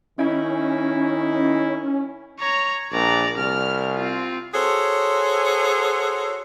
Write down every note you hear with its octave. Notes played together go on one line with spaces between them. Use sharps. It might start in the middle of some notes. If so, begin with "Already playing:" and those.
D#3 C#4 D#4 E4
C#5 A#5
A#1 D5 A#5
C2 F6
C4 F4
F#4 G#4 A4 C5 C#5